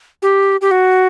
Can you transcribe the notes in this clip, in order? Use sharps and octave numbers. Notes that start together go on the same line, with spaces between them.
G4
G4
F#4